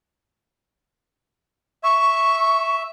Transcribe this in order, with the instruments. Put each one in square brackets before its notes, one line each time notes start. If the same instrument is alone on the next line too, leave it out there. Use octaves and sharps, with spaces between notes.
[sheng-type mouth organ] E5 [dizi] C#6